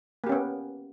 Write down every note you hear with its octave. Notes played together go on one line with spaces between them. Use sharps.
A#3 B3 C#4 G4